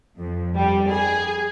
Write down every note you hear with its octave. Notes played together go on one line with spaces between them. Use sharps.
F2
G2 G3
G#4